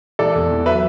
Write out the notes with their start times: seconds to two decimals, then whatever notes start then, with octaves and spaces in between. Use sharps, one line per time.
0.19 E3 A4 D5
0.35 E2
0.51 E3
0.66 F#3 B4 E5